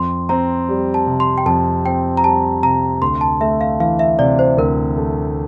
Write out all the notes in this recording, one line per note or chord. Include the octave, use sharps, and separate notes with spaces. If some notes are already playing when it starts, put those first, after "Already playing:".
Already playing: F2 C6
C4 A#5
G3
A5
C3
C6
G5
F2 A5
C4 G5
A#5
G3 A5
C3 A#5
D2 C6
A5
A3 E5
F5
E3 F5
E5
C3 D5
C5
D2 A#4
A3